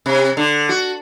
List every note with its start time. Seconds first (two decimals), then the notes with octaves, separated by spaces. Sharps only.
0.06 C3
0.37 D3
0.69 F#4